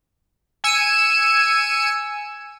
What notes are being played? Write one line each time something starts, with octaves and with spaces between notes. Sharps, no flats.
G#5 E6 C#7 D#7